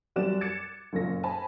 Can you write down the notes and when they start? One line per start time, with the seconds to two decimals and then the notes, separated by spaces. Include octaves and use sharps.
0.16 F#2 G3 F#4 D5 F#6 E7
0.41 D6 G#6 A6 C#7 E7
0.93 F#1 F#2 A#2 A3 A#6
1.23 C5 G#5 A5 B5